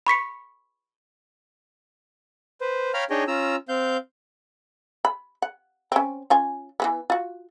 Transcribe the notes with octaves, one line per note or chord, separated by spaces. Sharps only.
B5 C#6 B6 C#7
B4 C5
C#5 F5 G5 A#5 B5 F6
D4 D#4 G#4 C#5 D#5 G5
C#4 F4 A#5 E6
C4 F5 G6
B5
F#5
C4 C#4
C#4 F4 G#5
E3 G#3 B3
F4 F#4